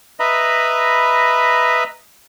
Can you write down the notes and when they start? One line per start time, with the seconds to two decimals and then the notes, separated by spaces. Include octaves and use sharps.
0.20 B4 D#5 E5 A#5 B5